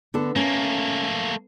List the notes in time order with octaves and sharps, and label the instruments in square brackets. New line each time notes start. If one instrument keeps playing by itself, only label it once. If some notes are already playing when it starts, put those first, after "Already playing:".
[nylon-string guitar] D3 B3 A4
[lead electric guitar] A3 A#3 [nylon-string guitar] C#4